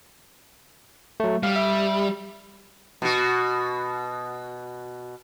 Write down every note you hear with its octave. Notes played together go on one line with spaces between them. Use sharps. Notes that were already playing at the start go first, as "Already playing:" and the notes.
F#3 A3
G3 F5
E5
B2 F#4